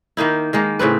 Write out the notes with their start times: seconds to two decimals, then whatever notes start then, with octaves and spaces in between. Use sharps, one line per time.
0.17 D#3 A#3 D#4 E4
0.53 D#3 G#3 A#3
0.79 A2 C#3 C4 B4